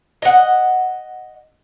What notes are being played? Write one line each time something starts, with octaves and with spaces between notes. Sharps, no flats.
D#5 F#5